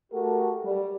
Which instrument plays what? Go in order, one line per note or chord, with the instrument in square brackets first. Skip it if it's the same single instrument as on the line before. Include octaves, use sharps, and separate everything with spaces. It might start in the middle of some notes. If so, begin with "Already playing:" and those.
[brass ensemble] A3 F#4 G4 A4 A#4
G3